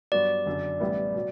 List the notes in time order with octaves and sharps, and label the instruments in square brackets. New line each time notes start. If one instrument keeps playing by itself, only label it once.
[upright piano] G2 F#3 B3 F#4 [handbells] D5
[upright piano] F#1 F#2 D3
A1 A2 G3 B3 E4
B2 F#3